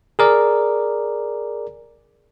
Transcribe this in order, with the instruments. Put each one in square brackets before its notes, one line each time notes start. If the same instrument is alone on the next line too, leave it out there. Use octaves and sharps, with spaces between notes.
[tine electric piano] G#4 A#4 D5